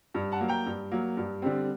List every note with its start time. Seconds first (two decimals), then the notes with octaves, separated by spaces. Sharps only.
0.14 G2
0.32 F#5 A5
0.41 F#3 A#3
0.48 G5 A#5
0.66 G2
0.91 F#3 A#3
1.17 G2
1.42 D3 G3 C4